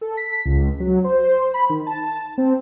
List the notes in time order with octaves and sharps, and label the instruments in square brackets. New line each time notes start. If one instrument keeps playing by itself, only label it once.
[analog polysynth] A4
B6
C#2
F#3
C5
B5
D#3
A5
C4